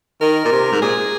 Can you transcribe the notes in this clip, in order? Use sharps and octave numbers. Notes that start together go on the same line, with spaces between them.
D#3 A#4
A#2
C3
G#2
A#2 G#4